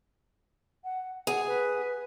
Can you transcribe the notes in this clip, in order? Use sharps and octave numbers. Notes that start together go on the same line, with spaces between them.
F#5
G#4 F#5
B4